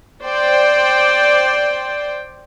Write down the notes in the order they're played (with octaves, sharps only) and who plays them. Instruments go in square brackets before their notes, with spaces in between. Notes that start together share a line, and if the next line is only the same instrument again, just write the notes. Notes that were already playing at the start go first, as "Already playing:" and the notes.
[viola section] C5 D5 G5